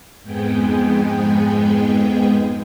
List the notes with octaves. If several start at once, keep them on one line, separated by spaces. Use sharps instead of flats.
F2 G#2 G#3 B3 G#4 G5